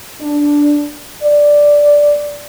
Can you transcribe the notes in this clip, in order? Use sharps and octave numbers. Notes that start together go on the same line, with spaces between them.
D4
D5